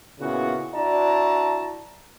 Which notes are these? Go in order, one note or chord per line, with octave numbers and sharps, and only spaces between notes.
A#2 C#3 B3 E4 F#4
D4 E4 F#4 D5 A5 A#5